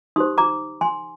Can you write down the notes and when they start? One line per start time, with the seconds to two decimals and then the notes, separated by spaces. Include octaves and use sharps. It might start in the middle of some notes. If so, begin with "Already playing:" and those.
0.16 D#4 G4 C5 C6 D#6
0.38 A#5 D6
0.81 G#5 C6